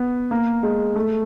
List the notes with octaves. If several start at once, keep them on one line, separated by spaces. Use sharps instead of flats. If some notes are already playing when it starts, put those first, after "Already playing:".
Already playing: B3
A#3
G#3
A3